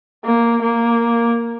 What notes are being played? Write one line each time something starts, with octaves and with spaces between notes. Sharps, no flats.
A#3
A#3